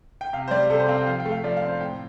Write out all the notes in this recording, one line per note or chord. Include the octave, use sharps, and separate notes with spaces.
G5
C3 F5
C5
G3 D5
C3 A4
C5
C4 F5
G5
F3 F5
G5
A3
F5
F3 D5
F5
C4
C5
A2 G5